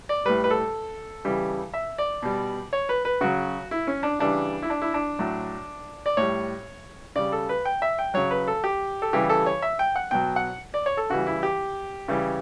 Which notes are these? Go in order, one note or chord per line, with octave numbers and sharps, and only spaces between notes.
D5
A2 G3 B4
B4
A4
C#3 E3 G3
E5
D5
B2 G3
C#5
B4
B4
C#3 F#3 F#4
E4
C#4
D4
C#3 E3 G3 D4
E4
D4
E4
D4
A2 F#3
D5
A2 G3 C#5
C#3 G3 D5
A4
B4
G5
E5
G5
C#3 F#3 C#5
B4
A4
G4
A4
C#3 E3 G3 G4
A4
C#5
E5
G5
F#5
B2 F#3 G5
F#5
D5
C#5
A4
C#3 E3 G3 F#4
E4
G4
C#3 E3 G3